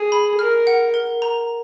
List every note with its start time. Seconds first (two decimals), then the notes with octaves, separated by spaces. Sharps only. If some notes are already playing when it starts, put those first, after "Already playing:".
Already playing: G#4
0.12 B5
0.39 A#4 F6
0.67 F#5
0.94 A#4
1.22 A#5